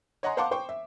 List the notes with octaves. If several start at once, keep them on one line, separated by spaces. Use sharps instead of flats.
C#5 D#5 F#5 G#5 A#5 C6
C5 F5 F#5 A5 C6 D6
C5 G5 C#6
E5